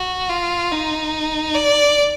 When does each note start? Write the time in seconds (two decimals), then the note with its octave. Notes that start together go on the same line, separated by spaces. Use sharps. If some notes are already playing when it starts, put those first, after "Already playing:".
Already playing: F#4
0.29 F4
0.72 D#4
1.54 D5